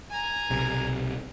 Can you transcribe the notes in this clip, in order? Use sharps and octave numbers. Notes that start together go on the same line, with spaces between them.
G#5 A#5
B1 C3